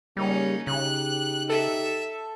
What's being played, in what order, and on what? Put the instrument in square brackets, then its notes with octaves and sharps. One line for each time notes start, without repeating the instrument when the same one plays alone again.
[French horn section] C#3 A#3 [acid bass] G3 [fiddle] C#4 D#4
[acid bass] C#3 [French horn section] D#4 G4 [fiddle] F#6
[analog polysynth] A4 [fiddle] E5